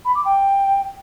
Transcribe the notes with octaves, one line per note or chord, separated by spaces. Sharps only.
B5
D6
G5